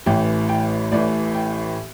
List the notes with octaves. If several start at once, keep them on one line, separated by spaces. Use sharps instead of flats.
A1 A2 E3 G5
G5
A1 A2 E3 D5
G5